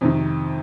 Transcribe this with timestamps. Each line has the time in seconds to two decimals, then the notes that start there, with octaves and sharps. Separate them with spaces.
0.01 F2 C3 D#3